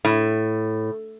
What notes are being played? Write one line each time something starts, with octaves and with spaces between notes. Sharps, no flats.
A2